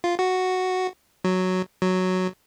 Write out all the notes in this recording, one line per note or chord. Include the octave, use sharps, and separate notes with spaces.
F4
F#4
F#3
F#3